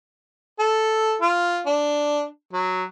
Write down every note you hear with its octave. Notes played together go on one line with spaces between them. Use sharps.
A4
F4
D4
F#3